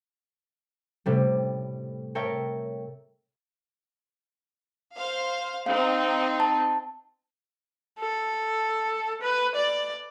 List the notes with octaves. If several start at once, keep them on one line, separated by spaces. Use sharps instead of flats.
A2 C3 G3
A#4 C#5 E5 G5 A5
C5 F5
C4 D#4 F5
A5
A4
B4
D5